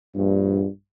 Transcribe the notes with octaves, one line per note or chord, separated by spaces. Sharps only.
A#1 G2